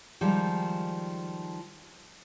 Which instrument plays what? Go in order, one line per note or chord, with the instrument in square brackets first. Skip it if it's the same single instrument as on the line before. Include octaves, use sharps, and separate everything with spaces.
[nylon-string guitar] D#3 F3 G3 G#3